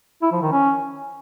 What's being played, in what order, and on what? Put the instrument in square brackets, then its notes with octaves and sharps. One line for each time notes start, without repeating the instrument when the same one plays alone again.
[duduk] E4
F3
D#3
C#4